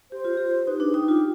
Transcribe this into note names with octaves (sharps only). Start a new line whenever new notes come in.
G4 C5
F4
G4
D#4 B4
D4
G#4
D#4 G4
F4